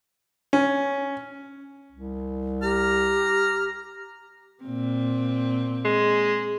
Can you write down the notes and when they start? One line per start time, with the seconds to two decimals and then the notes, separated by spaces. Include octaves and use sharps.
0.53 C#4
1.92 C2
2.63 G4 A#5 F6
4.64 A#2 C4
5.85 G#3